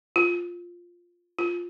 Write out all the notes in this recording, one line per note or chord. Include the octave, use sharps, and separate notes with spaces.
F4
F4